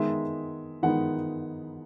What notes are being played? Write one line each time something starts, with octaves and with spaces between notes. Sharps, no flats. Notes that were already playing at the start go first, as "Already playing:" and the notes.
Already playing: D#3 G#3 B3 D#4 E5
D#3 G#3 B3 D#4 F#5